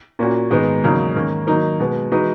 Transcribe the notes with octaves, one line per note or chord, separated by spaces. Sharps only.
A#2 A#3 C#4 F#4
G#2 D#3 G#3 B3 D#4
E2 C#3 F#3 A#3 D#4
G#2 D#3 A#3 C#4
D#3 F#3 A#3 D#4 A#4
B2 G#3 B3
E3 G#3 D#4 F#4 B4